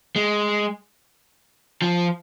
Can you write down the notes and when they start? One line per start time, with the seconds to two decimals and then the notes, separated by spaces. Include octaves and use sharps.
0.16 G#3
1.82 F3